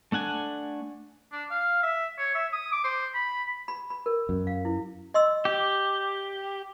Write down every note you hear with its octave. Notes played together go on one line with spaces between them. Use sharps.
A3 D4 F#5 G#5
D4
F5
E5
C#5
E5
D#6
D6
C5
B5
B5
B5
A#4
F#2
F5
E4
D#5 C6 E6
G4